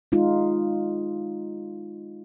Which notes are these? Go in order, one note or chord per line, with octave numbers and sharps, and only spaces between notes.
G#3 D#4 F4